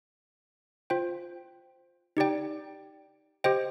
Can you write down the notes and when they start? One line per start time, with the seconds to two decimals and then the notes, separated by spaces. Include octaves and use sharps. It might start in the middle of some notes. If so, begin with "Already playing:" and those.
0.90 F4 C5 G5
2.17 D#4 G4 D5 G5
3.44 G4 C5 D#5 G5